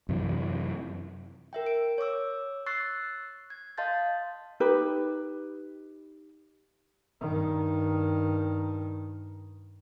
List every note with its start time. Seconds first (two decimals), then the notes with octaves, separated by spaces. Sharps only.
0.09 F#2 C3 E3
1.53 A#4 E5 G5
1.66 D7
1.98 C#5 C#6 D6 E6
2.66 C#6 E6 F#6 A6 C7
3.50 G#6
3.77 D#5 F5 A5 C6 G6 A6
4.60 D#4 G4 B4
7.20 G2 D#3